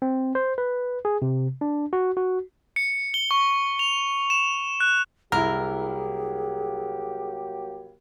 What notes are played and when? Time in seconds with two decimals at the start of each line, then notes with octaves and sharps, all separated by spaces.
0.02 C4
0.35 C5
0.58 B4
1.05 G#4
1.22 C3
1.61 D4
1.93 F#4
2.17 F#4
2.76 C#7
3.14 G7
3.31 C#6
3.79 F7
4.30 E7
4.80 F#6
5.32 C2 F#3 A#3 E4 G4 G#4 A#4